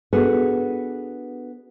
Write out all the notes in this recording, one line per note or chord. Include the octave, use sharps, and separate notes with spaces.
B3 D4 F#4 G#4 A4 B4